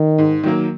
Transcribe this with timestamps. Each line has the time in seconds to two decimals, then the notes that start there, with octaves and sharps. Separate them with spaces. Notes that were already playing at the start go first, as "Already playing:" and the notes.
Already playing: D#3
0.18 G#2
0.44 D#3 F#3 A#3